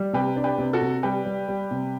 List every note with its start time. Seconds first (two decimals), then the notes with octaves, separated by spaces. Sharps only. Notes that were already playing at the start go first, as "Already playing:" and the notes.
Already playing: G3
0.13 C3 G4 B4
0.36 D4
0.44 G4 B4
0.58 C3
0.73 F#4 A4
0.82 C3
1.03 G3 G4 B4
1.25 G3
1.48 G3
1.71 C3